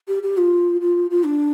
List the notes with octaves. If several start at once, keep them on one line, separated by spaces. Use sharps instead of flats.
G4
G4
F4
F4
F4
D4